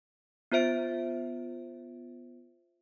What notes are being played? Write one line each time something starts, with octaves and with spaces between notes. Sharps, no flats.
B3 F4 C5 E5 D7